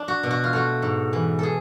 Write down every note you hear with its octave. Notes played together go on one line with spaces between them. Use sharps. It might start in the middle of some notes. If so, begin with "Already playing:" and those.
Already playing: D4
F#4
B2
F#4
F4
A3 F#4
G#2
E3
G#4 A4